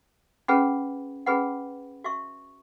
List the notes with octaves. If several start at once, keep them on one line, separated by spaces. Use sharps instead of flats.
C#4 G#4 B4 F#5 B5
C#4 G#4 B4 F#5 B5
F#4 E5 C#6